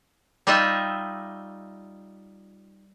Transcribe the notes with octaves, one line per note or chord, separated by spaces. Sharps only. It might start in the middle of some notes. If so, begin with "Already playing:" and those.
G3 D#4 F4 D#5 E5